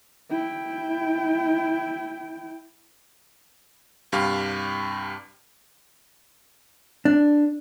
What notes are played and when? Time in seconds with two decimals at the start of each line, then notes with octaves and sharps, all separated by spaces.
0.30 E4 G5
4.12 C2 G2 G4 F5 F6
7.05 D4